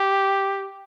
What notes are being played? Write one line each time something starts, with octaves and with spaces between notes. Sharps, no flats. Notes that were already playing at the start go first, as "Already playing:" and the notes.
Already playing: G4